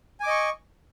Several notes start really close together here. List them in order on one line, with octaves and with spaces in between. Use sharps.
G#5 D6 D#5 C#6